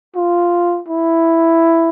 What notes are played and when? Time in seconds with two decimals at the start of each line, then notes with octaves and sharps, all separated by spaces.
0.16 F4
0.88 E4